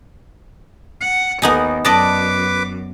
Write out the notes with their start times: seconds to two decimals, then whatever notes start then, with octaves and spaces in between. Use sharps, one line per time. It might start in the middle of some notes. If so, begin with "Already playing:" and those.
1.01 F#5
1.42 D#2 B3 D#4 G#5
1.85 F#2 B4 D5 D#5 A5 D6